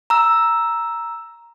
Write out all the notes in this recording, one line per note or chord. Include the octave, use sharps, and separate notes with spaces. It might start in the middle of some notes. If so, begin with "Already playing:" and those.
A#5 E6